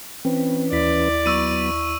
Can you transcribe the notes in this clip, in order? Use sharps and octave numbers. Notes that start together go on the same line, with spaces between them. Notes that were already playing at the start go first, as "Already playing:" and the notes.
E3 C4 C#4 B4
D#2 E4 D5 B6
F#3 B3 B5 C#6 E6 D#7